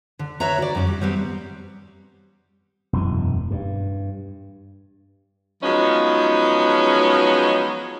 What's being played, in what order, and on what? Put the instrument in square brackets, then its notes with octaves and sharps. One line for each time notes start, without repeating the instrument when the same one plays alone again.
[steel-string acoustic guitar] D3
B4 C#5 E5 A#5
F#4 D5
F#2 C#4 A#4
G3
G3 B3 C4
[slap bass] E1 F#2 E3
G2
[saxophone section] F3 F#3 G#3 B3 C#4 D#4